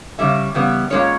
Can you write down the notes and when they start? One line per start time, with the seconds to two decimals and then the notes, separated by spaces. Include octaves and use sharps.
0.18 C#3 E3 G3 C#4 E5
0.54 C#3 E3 G3 B3
0.90 A#2 G#3 C#4 C#5